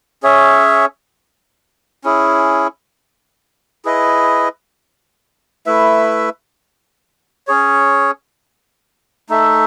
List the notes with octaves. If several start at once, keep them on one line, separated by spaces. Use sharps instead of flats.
C#4 G#4 C#5 E5
C#4 E4 G#4
E4 G#4 B4 D#5
A3 E4 B4 E5
C#4 G#4 C#5
A3 D#4 A4 E5